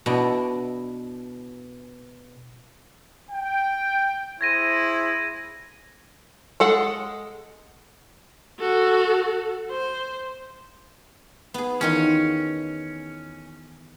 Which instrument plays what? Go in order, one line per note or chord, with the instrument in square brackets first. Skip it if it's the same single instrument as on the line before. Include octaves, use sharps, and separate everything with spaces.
[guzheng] B2 D4 E4
[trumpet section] G5
[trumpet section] E4 G#4 C5 [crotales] G#6 A#6 D#7
[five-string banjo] G#3 A4 F#5
[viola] F#4 A4
C5
[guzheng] B3 G#4
[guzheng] E2 D#3 F4 [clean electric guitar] C#4